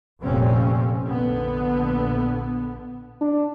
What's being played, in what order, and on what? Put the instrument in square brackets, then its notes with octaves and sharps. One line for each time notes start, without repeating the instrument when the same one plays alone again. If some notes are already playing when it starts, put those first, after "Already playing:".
[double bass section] F1 F2 A#2 G3 C4 C#4
A#1 D3 B3
[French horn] D4